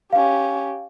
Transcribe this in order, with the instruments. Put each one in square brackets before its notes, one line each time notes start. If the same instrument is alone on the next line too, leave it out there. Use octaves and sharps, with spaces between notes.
[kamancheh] C#4 G4 [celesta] F5